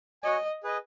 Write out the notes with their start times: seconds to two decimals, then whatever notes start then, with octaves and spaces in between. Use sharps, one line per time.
0.23 F#4 C#5 D#5 G#5
0.63 G#4 B4 D#5